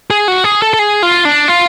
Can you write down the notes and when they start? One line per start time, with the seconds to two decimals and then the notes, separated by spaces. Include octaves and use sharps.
0.11 G#4
0.28 F#4
0.44 G#4
0.62 A4
0.74 A4
0.79 G#4
1.03 F4
1.25 D4
1.48 F4